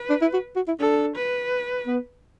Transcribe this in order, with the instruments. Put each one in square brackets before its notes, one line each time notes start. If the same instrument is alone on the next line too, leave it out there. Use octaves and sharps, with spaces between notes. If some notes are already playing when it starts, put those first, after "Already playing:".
Already playing: [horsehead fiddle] B4
[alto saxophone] D4
E4
F#4
F#4
E4
[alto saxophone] D4 [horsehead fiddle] A4
[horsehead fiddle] B4
[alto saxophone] B3